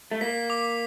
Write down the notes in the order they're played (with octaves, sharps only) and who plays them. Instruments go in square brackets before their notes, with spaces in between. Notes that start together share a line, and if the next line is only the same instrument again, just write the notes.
[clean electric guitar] A3
[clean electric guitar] A#3 [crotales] B6
[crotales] D6